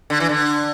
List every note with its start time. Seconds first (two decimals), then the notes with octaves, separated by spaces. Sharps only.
0.10 D3
0.20 E3
0.29 D3